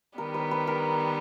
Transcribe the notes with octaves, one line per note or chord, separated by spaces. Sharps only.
D#3 G3 B3 A#4
B4
B4
A#4